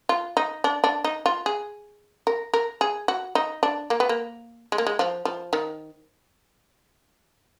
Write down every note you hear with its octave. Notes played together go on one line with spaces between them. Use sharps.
F4
D#4
D4
D4
D#4
F4
G#4
A#4
A#4
G#4
F#4
D#4
D4
A#3
B3
A#3
G#3
A#3
G#3
F3
F3
D#3